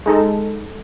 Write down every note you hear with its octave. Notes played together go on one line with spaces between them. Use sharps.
G#3 D#4 A4